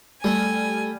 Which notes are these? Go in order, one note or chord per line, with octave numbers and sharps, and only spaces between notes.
G3 A3 G#5